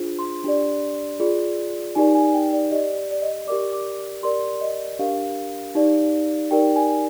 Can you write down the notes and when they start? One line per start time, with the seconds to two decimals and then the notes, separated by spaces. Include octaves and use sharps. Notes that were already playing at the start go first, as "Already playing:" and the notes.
Already playing: D4 F4 G#4 C5
0.19 C6
0.44 D4 G4 D5
1.20 F4 G#4 D5
1.95 D#4 G4 A#4 D5 G#5
2.15 G#5
2.34 G5
2.53 D5
2.71 G4 D5 D#5
3.11 D5
3.22 D#5
3.47 G4 A#4 D5 D6
3.73 D6
4.23 G4 A#4 D5 C6
4.61 D#5
4.99 D4 G4 A#4 F5
5.75 D#4 G4 D5
6.51 D#4 G4 A#4 D5 G5
6.76 G#5